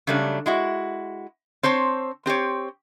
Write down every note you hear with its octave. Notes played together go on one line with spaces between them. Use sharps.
C#3 F#3 G3 A3 D4
G#3 E4 F#4
C4 C5 C#5 A5
C4 G4 C5 C#5